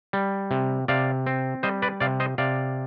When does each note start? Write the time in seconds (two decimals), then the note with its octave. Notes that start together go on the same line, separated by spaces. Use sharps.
0.13 G3
0.51 C3
0.88 C3 D5 F5
1.27 C4
1.63 G3 C5 D#5
1.82 B4 D5
2.00 C3 D5 F5
2.20 C5 D#5
2.38 C3 D5 F5